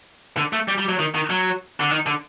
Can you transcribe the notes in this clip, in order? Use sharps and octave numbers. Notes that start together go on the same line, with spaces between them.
D3
A3
G3
G3
F#3
D#3
D#3
F#3
D3
D#3
D3